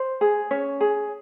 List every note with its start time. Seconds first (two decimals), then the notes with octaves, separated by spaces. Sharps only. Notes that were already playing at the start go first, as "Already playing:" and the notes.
Already playing: C5
0.21 G#4
0.51 C#4 C#5
0.81 G#4